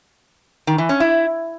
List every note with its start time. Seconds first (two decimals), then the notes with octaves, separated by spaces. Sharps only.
0.67 D#3
0.78 E3
0.89 C#4
1.00 E4